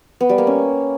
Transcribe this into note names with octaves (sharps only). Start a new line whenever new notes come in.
B3
G3
A#3
C#4